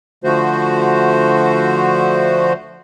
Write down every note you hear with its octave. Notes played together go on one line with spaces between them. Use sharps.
D3 F3 A3 F#4 C5